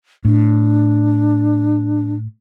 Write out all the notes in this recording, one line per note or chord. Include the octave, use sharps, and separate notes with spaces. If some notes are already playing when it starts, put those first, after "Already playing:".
A2 D4